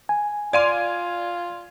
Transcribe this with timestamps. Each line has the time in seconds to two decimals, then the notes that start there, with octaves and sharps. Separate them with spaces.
0.09 G#5
0.53 F4 D5 F5 C6 G#6 D#7